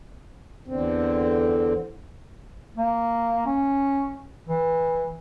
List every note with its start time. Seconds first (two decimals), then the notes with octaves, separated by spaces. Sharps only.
0.68 E2 D3 C4
2.77 A#3
3.46 C#4
4.48 E3